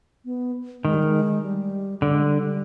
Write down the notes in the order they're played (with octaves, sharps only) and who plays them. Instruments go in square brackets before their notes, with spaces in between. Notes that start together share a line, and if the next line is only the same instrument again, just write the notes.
[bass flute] B3
[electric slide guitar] D#3 [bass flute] G#3
[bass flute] G3
G#3
G3
[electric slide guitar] D3 [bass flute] G3
[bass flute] G#3
G3